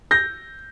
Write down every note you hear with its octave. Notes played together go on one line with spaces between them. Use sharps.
G6 A#6